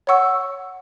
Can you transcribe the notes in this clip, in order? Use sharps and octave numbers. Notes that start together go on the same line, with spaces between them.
C#5 F#5 C#6 E6